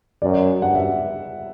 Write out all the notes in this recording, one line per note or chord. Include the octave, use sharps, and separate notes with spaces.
F#2 D5
G2 F#5
E5